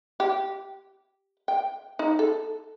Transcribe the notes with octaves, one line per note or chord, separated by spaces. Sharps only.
G4
G5
D#4
A4